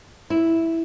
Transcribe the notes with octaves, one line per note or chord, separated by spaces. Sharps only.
E4